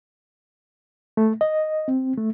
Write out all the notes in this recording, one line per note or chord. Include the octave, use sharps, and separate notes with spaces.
A3
D#5
C4
A3